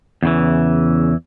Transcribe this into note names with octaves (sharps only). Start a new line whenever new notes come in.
E2 C#3 E3